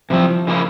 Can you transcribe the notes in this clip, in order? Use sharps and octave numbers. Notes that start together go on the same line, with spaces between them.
C3 F3 G3 C4 E4
C#3 F3 A#3 E4